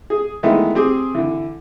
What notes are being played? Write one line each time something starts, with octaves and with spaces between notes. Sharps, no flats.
G#4
D#3 E3 G#3 A3 B3
C4 G4 G#4
D3 E3